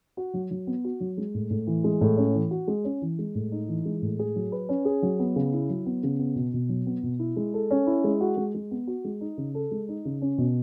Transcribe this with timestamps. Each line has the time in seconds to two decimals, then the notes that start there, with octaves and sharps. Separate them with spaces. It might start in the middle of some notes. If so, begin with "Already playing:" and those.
0.17 F#4
0.34 F#3
0.51 F#3
0.67 B3
0.84 F#4
1.00 F#3
1.17 G#3
1.34 A2
1.50 A2
1.67 E3
1.84 G#3
2.01 A2
2.17 C#4
2.35 E3
2.51 F#4
2.68 G#3
2.84 C#4
3.02 E3
3.19 G#3
3.35 A2
3.52 D#4
3.68 E3
3.85 G#3
4.02 A2
4.19 G#4
4.36 F#3
4.52 B4
4.69 C#4
4.85 G#4
5.03 F#3
5.19 B3
5.36 C#3
5.53 E4
5.70 F#3
5.86 B3
6.03 C#3
6.19 B3
6.36 B2
6.54 B2
6.69 F#3
6.86 B3
7.03 B2
7.19 E4
7.36 G#3
7.54 A4
7.71 C#4
7.87 E4
8.04 G#3
8.21 F#4
8.37 G#3
8.55 G#3
8.71 B3
8.87 F#4
9.04 G#3
9.21 D#4
9.37 C#3
9.54 A4
9.71 G#3
9.88 D#4
10.05 C#3
10.22 C#4
10.38 B2